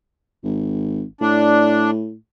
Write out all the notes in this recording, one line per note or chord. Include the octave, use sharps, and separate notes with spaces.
G#1
A2 D4